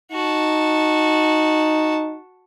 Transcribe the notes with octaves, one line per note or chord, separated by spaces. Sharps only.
D#4 F#4 A5